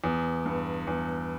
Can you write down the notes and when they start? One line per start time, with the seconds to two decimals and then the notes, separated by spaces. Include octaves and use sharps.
0.04 E2
0.45 G2
0.87 E2